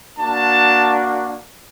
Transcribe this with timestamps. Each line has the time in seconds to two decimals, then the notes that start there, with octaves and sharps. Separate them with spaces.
0.18 A#3 D4 F#4 A5